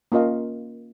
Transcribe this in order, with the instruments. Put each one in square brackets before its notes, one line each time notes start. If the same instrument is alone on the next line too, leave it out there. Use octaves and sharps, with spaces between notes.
[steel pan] A#3 C#4 F4 D#5 F5